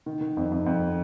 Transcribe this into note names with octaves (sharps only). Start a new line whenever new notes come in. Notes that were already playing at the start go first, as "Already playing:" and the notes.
D#3
D#3
F2
F2
F2